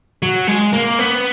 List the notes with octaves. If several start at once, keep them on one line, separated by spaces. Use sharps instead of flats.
F#3
G#3
A#3
B3